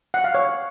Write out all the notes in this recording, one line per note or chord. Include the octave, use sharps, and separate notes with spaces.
F#5
F5
C#5